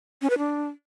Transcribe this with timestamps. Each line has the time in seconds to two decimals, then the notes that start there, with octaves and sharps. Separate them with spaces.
0.22 C#4
0.30 B4
0.38 D4